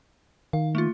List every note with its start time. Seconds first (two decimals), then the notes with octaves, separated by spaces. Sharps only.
0.53 D#3 F5
0.75 A3 A#3 F4